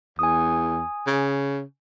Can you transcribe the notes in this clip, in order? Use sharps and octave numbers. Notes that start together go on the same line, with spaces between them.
E2 G#5 D#6
C#3